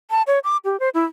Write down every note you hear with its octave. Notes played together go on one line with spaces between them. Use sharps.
A5
C#5
D6
G4
C5
E4